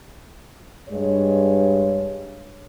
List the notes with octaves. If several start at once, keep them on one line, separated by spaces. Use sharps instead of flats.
G2 G#3 C#5